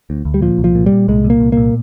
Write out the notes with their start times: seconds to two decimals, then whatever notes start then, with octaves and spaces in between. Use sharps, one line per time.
0.10 D2
0.25 D2
0.34 G3
0.42 A#2 F3
0.58 C2
0.64 F3
0.75 A#2
0.86 G3
0.92 A#2
1.08 C2 G#3
1.24 A#2
1.30 A#3
1.40 C2
1.52 A#2 A#3